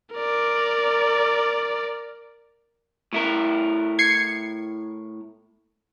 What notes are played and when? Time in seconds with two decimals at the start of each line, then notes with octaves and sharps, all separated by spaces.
0.15 A#4 D5
3.13 A2 E4 A#4
3.99 G#6 C7 C#7